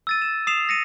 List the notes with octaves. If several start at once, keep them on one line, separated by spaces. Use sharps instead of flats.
E6 A6 D#7
E7
D#6 C7 E7 F7
A#6 C#7 D#7